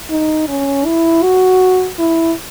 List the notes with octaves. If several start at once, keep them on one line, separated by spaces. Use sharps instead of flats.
D#4
C#4
E4
F#4
E4